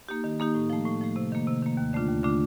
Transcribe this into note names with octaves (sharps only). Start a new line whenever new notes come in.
A#3 D#4 G4
D#3
A#3 D#4 G4
A2
F3 A3
A2
F3 A3
C3
D#3 A#3
C3
D#3 A#3
D#2
D3 A3 D4 F4
D#2
D3 A3 D4 F4